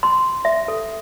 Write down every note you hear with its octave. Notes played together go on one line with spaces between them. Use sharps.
C6
E5
A4